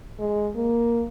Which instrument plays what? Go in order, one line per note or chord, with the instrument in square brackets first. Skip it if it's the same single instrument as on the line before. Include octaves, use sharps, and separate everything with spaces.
[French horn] G#3
A#3